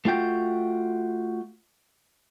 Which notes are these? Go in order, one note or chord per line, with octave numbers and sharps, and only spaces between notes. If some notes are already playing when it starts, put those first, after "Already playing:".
A3 F4 F#4 G5